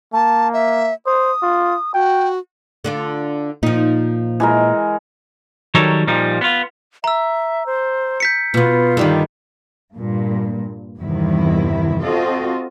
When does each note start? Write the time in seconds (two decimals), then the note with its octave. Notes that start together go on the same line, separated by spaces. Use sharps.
0.13 A#3 A5
0.53 E5
1.06 C5 D#6
1.42 F4
1.94 F#4 G5
2.84 D3 D4 F4
3.63 A#2 F3 D#4
4.40 E3 G#3 A#4
5.75 D#3 F#3 G3 A4 A#4 C#5
6.07 A#2 F3 G3 D#4
6.41 B3 F4
7.04 E5 A#5 E6
7.66 C5
8.20 G6 B6 C#7
8.54 B2 B3 F4
8.97 G2 D3 D#3 G3 D#4
9.94 G2 A#2
11.00 E2 G2 C3 D#3 E4
12.03 C4 F4 F#4 A4 D#5